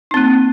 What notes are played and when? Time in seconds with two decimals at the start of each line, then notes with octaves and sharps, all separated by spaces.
0.11 D#4
0.14 C4
0.17 A#3